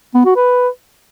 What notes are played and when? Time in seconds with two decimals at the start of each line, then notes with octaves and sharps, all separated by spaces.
0.14 B3
0.25 F#4
0.36 B4